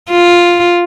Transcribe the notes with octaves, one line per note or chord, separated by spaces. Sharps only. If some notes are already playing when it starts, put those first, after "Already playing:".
F4